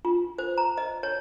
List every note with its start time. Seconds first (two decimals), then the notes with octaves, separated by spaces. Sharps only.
0.05 F4
0.38 C5
0.58 A#5
0.78 D#5
1.03 C#5